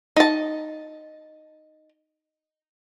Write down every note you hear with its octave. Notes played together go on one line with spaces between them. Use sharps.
D#4 A5